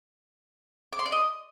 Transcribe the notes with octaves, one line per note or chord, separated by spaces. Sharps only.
D6
C6
D5
D#5